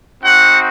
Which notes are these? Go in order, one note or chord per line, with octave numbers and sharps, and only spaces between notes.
C4 D#4 F#4 F#5